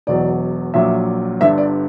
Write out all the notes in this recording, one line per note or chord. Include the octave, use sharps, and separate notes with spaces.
E1 E2 B2 F#3 D5
A#1 A#2 F#3 E5
G1 G2 D3 E5
D5